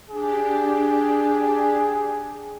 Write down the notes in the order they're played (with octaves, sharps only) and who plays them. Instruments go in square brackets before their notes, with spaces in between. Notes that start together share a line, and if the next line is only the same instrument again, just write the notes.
[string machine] D4 G4 [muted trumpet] G#4